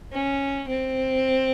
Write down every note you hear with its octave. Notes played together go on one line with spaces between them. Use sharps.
C#4
C4